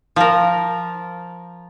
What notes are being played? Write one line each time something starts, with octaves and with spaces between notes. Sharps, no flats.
F3 A#4